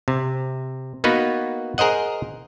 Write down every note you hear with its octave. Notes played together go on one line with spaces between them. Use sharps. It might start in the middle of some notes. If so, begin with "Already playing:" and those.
C3
A#3 B3 D#4 F#4 B4
G#4 A#4 C5 D#5 F#5